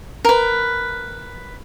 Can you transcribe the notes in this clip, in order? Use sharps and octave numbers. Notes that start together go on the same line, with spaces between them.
A#4 B4